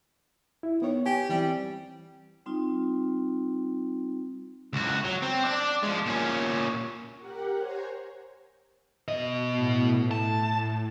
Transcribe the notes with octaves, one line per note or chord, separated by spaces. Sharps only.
E4
D#3 B3 C#5
G4 G#5
E3 G3 C4
G3 C4 D#4 F4
C#2 F#4
F#3
C4
D4 D5
F3 G#3
A#2 C#4
G4 A#4 F#5
C5 C#5 G#5 A#5
B2 D#5
A2
A5